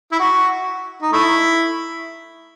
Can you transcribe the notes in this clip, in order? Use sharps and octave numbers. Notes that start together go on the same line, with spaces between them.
E4
F#4
D#4
A3 E4